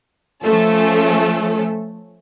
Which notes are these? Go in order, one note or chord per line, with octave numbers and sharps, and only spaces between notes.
F3 A3 C#4 A4